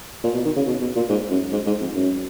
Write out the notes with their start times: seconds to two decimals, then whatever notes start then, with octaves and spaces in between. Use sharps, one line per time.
0.24 A#2
0.34 B2
0.45 D#3
0.56 C#3
0.66 B2
0.81 B2
0.96 A#2
1.09 G#2
1.30 F#2
1.52 G#2
1.66 G#2
1.81 F2
1.95 F#2